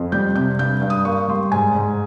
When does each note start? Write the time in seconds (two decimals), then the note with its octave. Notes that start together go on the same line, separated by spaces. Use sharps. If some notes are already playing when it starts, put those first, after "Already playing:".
Already playing: F2
0.12 G3 G6
0.35 C3 G6
0.59 G2 G6
0.82 G2
0.90 D#6
1.05 A#3 C#6
1.28 G3 C6
1.52 G#2 G#5
1.75 G#2